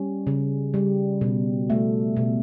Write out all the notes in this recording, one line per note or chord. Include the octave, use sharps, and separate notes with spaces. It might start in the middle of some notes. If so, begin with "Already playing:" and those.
Already playing: G3 C#4
C#3
G3
B2
A3
B2